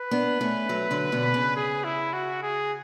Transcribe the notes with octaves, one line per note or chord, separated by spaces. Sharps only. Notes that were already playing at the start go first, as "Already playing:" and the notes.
Already playing: B4
B3 D4
A3 C#4
F#3 A3
D3 F#3
B2 D3
C#3
G#4
E4
F#4
G#4